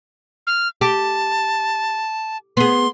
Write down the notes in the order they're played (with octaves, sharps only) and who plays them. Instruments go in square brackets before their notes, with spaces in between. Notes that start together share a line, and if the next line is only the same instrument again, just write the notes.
[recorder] F6
[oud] G4 [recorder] A5
[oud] B3 G#4 [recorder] C6